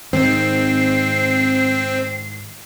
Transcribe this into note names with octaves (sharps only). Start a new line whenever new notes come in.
G#2 D#3 C4 C7